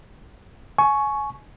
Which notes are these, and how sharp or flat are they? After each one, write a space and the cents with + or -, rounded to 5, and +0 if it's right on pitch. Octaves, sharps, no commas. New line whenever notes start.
G#5 +25 C#6 +0